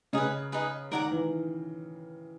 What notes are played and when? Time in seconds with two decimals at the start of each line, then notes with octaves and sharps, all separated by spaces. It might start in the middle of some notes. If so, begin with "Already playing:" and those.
0.13 C#3 D#4 G#4 B4
0.52 D#4 G#4 B4
0.91 D#3 A#4 D5 F#5 A#5
1.11 E3